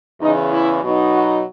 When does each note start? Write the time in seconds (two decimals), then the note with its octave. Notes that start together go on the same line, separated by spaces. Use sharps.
0.21 E2 C#3 E3 D#4
0.52 E4
0.83 B2 F#3 B3 D#4
1.14 F#4